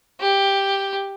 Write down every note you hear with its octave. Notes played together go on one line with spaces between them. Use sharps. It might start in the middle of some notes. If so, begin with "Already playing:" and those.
G4